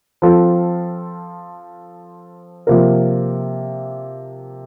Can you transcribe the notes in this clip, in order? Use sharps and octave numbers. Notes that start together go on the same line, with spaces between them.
F3 C4 F4 A4
C3 F3 A#3 F4 A#4